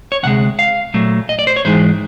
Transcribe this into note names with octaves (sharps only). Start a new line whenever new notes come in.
C#5
D2 C3 G#3 F#5
F5
A#2 F#3 A3
D#5
D5
C5
C#5
G#2 E3 G#3 C5